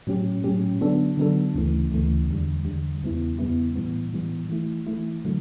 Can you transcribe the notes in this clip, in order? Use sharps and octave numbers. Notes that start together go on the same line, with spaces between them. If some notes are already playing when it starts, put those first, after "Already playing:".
A2 F#3 C#4 G4
A2 F#3 C#4 G4
D3 F#3 B3 D4 A4
D3 F#3 B3 D4 A4
D2 C#3 E3 A3
D2 C#3 E3 A3
E2 D3 G3
E2 D3 G3
E2 C#3 G3 B3 E4
E2 C#3 G3 B3 E4
A2 E3 G3 B3
A2 E3 G3 B3
E3 A3 E4
E3 A3 E4
D3 F#3 A3